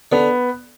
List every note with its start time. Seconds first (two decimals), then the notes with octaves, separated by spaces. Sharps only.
0.12 D3 B3